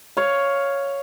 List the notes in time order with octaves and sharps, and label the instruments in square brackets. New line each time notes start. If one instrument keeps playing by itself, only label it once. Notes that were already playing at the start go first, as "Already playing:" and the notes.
[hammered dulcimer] C#5 F5